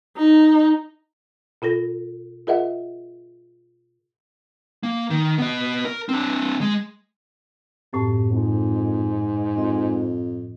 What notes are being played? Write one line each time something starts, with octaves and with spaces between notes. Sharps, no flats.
D#4
B2 F4 A4 A#6
F4 G#4 A#4 D#5 E5 F#5
A#3
D#3
B3 D#5
A#4
C4 D4
G#3
F#2 A2 C3 A5
F2 G#2
F2 D#5 C6